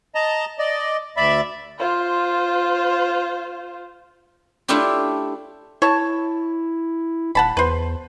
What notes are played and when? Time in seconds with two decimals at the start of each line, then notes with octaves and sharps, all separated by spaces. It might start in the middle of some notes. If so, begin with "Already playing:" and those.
0.15 D#5 A5 A#5
0.59 D5 D#5
1.17 D2 D5 E5 B5
1.79 F4 C5
4.68 A3 D4 E4 F4 G4 C#5
5.82 E4 C#5 A5
7.35 D#1 F#5 A5 B5
7.57 E2 B4 C5